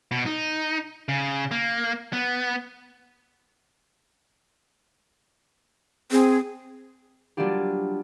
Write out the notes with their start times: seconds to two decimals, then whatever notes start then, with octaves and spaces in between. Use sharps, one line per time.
0.11 B2
0.26 D#4
1.09 C#3
1.51 A#3
2.13 B3
6.12 C4 G#4
7.37 F#3 G3 A#3 D4 F4 G4